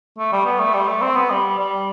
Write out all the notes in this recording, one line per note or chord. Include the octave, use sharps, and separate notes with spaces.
A3
G3
B3
A3
G3
A3
C4
B3
G3
G3